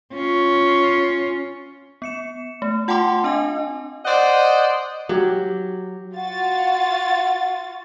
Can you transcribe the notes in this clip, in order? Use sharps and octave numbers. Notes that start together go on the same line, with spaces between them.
C#4 F4
B3 C#7 E7
A3
F4 F#5 G5 A5 C6 D6
C4 D4 D#5 G#5
C5 D5 D#5 F#5
F#3 G4
F4 F#4 F#5 A6